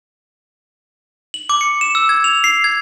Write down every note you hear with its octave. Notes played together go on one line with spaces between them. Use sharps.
F#7
D6
C#7
E7
E6
G#6
F7
C7
G#6